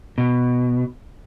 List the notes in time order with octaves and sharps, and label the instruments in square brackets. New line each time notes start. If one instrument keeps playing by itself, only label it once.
[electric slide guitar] B2